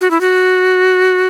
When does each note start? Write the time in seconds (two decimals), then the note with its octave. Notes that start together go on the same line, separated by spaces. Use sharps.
0.01 F#4
0.11 E4
0.21 F#4